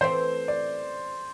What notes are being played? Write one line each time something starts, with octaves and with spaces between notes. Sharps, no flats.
E3 A3 C4 C5
D5